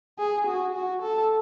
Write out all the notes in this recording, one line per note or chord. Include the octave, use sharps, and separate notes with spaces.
G#4
F#4
F#4
A4